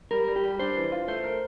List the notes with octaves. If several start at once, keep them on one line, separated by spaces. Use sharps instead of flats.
G3 A#4
G3
G4
G3
D4 C5
E3
F4
A3 C5
A#4